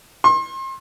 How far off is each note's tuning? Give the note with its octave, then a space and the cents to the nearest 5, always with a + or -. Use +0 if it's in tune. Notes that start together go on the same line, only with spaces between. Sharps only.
C6 +35